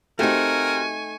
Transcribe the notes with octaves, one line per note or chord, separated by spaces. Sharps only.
A3 C4 D#4 F#4 G4 A#4 G#5 C#6